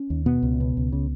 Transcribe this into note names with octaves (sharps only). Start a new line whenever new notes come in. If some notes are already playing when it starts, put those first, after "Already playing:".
Already playing: C#4
D#2
B2 B3
C#2
B2
C#2
C#3